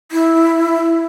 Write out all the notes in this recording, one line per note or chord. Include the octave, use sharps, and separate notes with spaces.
E4